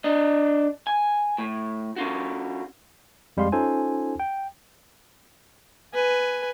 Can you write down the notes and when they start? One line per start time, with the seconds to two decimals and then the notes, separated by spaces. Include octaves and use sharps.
0.04 D4 D#5
0.87 G#5
1.38 A2
1.96 C#4 F4 F#4
3.37 F2 G3 G#3 F5 C6
3.52 C#4 D#4 F4 A4 C5 G#5
4.20 G5
5.94 B4 G#5